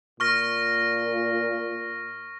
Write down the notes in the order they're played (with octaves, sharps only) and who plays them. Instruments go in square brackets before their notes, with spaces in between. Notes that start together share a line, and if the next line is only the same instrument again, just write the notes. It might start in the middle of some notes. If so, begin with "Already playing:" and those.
[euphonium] A#2 [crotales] C#6 F6 A#6